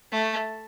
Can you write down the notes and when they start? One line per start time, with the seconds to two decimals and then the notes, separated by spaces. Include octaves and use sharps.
0.12 A3